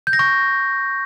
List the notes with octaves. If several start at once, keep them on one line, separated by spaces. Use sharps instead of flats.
G6
A#6
C#6